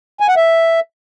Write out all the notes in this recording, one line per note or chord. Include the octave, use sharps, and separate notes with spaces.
G#5
F#5
E5